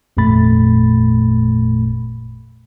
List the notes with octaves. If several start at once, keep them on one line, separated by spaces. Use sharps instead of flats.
G#1 F2 A#2 A3 B5 A6